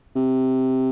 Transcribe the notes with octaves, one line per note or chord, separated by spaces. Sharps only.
C3